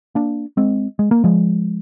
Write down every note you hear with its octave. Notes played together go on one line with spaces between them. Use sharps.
A#3 D4
G#3 C4
G#3
A#3
F3 G#3